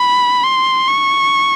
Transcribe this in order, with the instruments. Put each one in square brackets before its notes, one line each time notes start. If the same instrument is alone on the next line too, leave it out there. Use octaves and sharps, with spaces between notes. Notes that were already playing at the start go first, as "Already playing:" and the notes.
Already playing: [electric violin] B5
C6
C#6